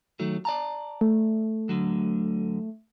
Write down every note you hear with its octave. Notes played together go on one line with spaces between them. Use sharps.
D#3 F#3 A3
D5 A5 A#5
A3
D2 D3 F#3